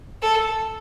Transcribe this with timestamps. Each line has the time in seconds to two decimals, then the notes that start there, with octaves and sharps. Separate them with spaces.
0.22 A4